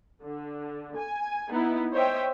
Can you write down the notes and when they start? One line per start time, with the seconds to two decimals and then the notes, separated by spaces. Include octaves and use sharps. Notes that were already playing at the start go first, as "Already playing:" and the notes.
0.23 D3
0.97 G#5
1.49 B3 D#4 E4
1.92 C5 C#5 D#5 E5 G5